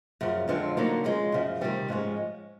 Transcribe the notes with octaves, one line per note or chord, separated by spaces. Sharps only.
F#2 C#3 F3
F2 D3 F3 G#3 C4
D3 F#3 A#3 D#4
C#3 F3 G#3
F#2 C#3 F3
C3 D#3 G3 C4
G#2 F3 G#3 C#4